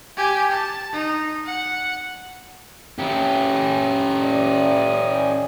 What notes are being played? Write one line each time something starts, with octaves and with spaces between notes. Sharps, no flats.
G4 G#5
A5
D#4
F#5
C#4 G4
D5 D#5